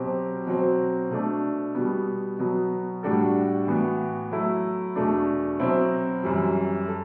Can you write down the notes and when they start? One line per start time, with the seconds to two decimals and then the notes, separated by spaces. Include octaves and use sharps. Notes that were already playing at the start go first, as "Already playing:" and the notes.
Already playing: B2 F#3 C4 G4
0.47 B2 F#3 C4
1.11 B2 A3 D4
1.75 B2 G3 B3
2.39 B2 F#3 B3
3.03 A2 G3 D4 F#4 A4
3.67 A2 E3 B3 F#4
4.31 F#3 A3 E4
4.95 E2 B2 A3 D4
5.60 B2 F#3 C4 E4
6.23 F#2 E3 G3
6.88 A4